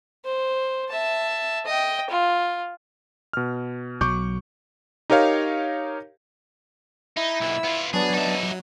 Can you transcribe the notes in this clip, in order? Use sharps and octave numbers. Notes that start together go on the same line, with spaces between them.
C5
E5 A5
D#5 G5
F4
B2 F6
B1 F#3 C#6 D6 G6
D#4 G4 A#4 C#5 F5
D#4 E4
B1 A#2 E6
B3 F4
F#3 B3 D4 G#4 A5
B2 D#4 E5